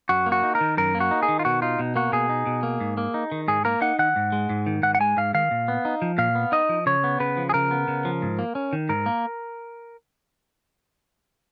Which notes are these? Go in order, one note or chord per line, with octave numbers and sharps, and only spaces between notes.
F#2 F#4
A#3
F#4
D#4
A#4
D#3
F#2 A#4
A#3
F#4
D#4
G#4
D#3
F4
B2 F#4
D#4 F4
B2
A#3 F#4
B2 G#4
D#4
B2
A#3
G#2
A#3
D#4
D#3
G#2 G#4
A#3 A#4
D#4 F#5
D#3 F#5
G#2
G#3
G#2
D#3
G#2 F#5
F#5
G#3 G#5
G#2 F5
D#3 F5
A#2
B3
D#4
F3
A#2 F5
B3
D#4 D#5
F3
C#3 C#5
B3
C#3 B4
F3
G#4
C#3 A#4
B3
C#3
F3
G#2
A#3
C#4
D#3
G#2 A#4
A#3